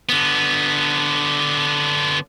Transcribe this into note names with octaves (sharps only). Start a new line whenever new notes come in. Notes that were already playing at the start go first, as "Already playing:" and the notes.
D3 B3